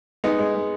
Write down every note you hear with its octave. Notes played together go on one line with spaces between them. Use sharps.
G#3 B3 D#4
G#3
G#3